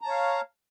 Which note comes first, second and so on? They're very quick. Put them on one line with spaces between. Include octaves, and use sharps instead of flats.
A#5 A5 C#5 F5